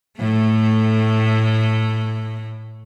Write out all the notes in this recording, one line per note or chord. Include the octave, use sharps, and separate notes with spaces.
A2 A3